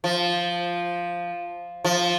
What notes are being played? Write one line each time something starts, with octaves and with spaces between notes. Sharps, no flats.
F3
F3